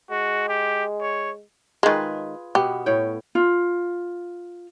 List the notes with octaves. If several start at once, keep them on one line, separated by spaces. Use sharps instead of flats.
G#3 F#4
G4
C#5
D#3 G#3 F4 G#4 B4
B2 B3 G4
A2 C#5 G5
F4